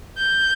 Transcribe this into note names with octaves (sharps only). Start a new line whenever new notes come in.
G6